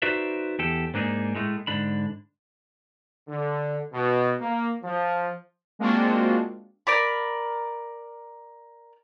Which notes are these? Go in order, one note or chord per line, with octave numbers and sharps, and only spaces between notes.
D#4 F#4 B4 C5 D5 E5
E2 G4 A4
G#2 A#3 D4 D#4 G#4
A2 G#3 A3
G#2 D3 D4 B5
D3
B2
A#3
F3
G#3 A#3 C4 D4 F4 F#4
A#4 D5 B5